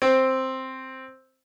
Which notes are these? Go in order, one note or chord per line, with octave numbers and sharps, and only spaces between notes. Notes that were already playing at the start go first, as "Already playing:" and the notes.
C4